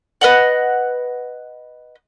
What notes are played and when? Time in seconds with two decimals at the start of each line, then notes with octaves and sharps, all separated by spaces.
0.21 B4 D#5 F#5